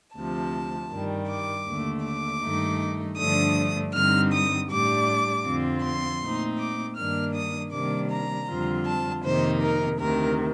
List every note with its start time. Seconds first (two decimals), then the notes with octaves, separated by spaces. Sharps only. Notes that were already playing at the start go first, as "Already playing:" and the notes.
0.15 D2 C3 F3 A5
0.91 G2 D#3 G3
1.29 D6
1.67 D#2 D3 A3
2.05 D6
2.42 G2 D#3 A3 D#4
3.18 G2 D3 F3 A3 D4 D#6
3.94 G2 D3 G3 C4 D#4 F6
4.32 D#6
4.70 A2 G3 D4 D6
5.45 F2 D3 F3 C4 F4
5.83 C6
6.21 A#2 A3 C4 D#4
6.59 D6
6.97 G2 D#3 A#3 D4 F6
7.35 D#6
7.72 C3 D#3 G3 A#3 D4 D6
8.11 A#5
8.48 F2 D3 G3 C4 F4
8.86 A5
9.24 F2 C3 D#3 A#3 D#4 C5
9.62 A#4
9.99 D2 C3 D#3 A#4